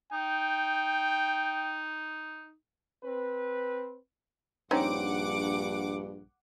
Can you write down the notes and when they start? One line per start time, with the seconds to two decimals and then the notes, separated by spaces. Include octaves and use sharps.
0.13 D#4 G5
3.04 C4 B4
4.71 A#1 G2 C4 C#4 D#4 F#5 D6